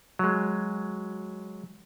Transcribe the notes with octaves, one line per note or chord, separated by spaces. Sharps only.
F#3 G#3